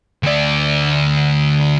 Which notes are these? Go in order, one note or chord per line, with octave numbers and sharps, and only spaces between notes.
D2 D5